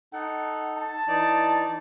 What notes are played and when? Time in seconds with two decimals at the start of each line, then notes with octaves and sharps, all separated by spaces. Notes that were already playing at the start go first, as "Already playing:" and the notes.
0.13 D#4 A4 F#5
0.78 A5
1.08 E3 D#4 D5